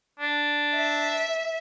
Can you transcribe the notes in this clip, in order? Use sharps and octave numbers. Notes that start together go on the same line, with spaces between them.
D4
E5